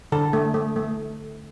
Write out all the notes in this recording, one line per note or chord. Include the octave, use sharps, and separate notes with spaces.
D3 A4
A3
A3
A3